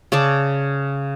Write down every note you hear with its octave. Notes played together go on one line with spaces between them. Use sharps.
C#3 C#4 D5 A5